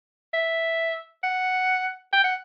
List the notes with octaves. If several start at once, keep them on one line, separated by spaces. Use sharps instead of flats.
E5
F#5
G5
F#5